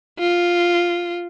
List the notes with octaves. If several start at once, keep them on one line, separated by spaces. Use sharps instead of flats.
F4